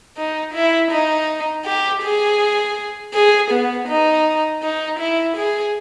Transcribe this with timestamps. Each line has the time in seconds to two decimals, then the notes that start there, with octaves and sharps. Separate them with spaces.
0.17 D#4
0.54 E4
0.91 D#4
1.65 G4
2.02 G#4
3.14 G#4
3.51 B3
3.88 D#4
4.62 D#4
4.99 E4
5.36 G#4